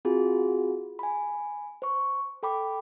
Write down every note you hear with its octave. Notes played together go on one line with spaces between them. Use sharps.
C4 F4 F#4 G#4
G#5 B5
C5 C#6
A4 G5 B5 D6